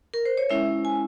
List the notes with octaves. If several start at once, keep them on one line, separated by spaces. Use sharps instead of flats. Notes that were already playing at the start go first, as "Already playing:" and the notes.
A#4
C5
C#5
G#3 C#4 E4 E5
G#5